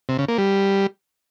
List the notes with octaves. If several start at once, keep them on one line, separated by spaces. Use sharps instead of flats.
C3
C#3
A#3
G3